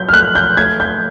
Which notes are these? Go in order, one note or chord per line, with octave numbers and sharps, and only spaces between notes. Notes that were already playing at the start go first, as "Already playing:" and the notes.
Already playing: F#3 G6
F6
A3 F#6
G6
A3 G#6
G6